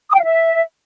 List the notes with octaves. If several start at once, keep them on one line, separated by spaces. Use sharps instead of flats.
D#6
G5
F5
E5